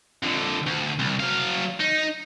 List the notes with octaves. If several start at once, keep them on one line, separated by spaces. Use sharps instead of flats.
F2 D3
D2
C2
F#3 F5
D#4